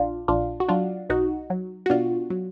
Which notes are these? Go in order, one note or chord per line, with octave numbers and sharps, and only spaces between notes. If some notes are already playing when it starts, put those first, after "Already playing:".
Already playing: A#1 D4 F4
A#1 D4 F4
F#4
F#3 D4 F4
B1 D#4 F#4
F#3
F#4
B2 D4 F4
F#3